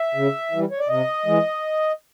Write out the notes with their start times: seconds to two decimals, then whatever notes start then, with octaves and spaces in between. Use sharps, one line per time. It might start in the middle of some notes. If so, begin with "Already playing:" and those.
Already playing: E5
0.15 C#3
0.51 E3 G3
0.71 C#5
0.79 D5
0.88 C3 D#5
1.26 E3 G#3